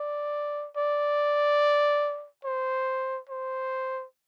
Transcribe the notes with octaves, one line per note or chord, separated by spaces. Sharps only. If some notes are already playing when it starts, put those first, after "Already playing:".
Already playing: D5
D5
C5
C5